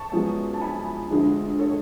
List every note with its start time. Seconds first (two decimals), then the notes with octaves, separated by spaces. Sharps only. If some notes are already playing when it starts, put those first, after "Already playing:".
Already playing: A5 C#6
0.12 F#2 F3 G#3 B3
0.54 A5
0.61 G#5 B5
1.10 D2 D3 F3 G#3
1.59 A4 C#5